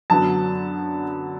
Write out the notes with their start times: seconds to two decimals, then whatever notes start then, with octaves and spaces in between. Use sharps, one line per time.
0.10 F#2 D3 F#3 B3 A5